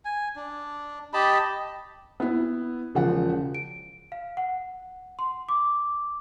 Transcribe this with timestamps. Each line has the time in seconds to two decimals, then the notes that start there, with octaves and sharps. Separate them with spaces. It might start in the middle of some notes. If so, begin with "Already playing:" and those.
0.05 G#5
0.36 D4
1.13 G4 D#5 A5 B5
2.20 B3 E4
2.95 E1 C#3 F3 F#5
3.55 D7
4.12 F5
4.37 F#5
5.19 C6
5.49 D6